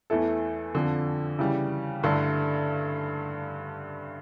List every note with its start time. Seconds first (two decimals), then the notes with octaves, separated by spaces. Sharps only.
0.10 E2 E3 A3 E4 A4
0.74 F2 D3 F3
1.39 C#3 E3 G3
2.03 G2 D3 A3 E4